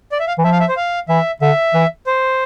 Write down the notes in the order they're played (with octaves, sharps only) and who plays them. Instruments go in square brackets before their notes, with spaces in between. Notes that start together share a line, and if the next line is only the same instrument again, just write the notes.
[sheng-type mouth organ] D5
E5
F5
[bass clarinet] E3
[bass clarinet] F3 [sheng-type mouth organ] E5
[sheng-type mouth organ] F5
E5
C5
F5
[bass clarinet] E3 [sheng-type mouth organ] E5
[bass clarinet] D3 [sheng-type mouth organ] E5
[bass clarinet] E3
[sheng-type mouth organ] C5